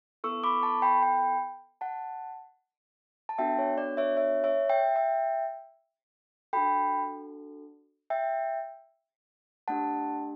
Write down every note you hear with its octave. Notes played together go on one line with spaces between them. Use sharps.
B3 E4 A4 C#6 E6
B5 D6
A5 C#6
G5 B5
G5 B5
F#5 A5
A5
B3 D4 F#4 A4 E5 G5
C#5
D5
C#5 E5
C#5 E5
C#5 E5
E5 G5
E5 G5
D4 F#4 A4 G5 B5
E5 G5
A3 D4 G4 F#5 A5